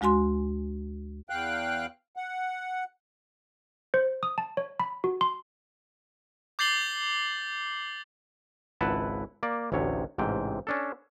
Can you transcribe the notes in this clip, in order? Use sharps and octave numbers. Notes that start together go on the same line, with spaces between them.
D2 G#3 F#4 G#5 C6
E2 F5 G5 F#6
F#5
C5
D#6
A5
C#5
B5
F#4
C6
D6 G6 A6 C7 F#7 G7
G#1 C#2 E4 B4 F#5 A5
A#3 D5
A1 D2 C3 C#5
A1 G#2 C3 G5
C#4 D4 A4